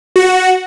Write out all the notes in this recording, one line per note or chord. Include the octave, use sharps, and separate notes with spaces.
F#4